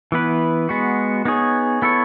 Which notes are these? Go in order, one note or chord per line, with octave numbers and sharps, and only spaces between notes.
E3 B3 E4 B4
G#3 B3 F#4
B3 D#4 G#4 C#5
B3 E4 A4 C#5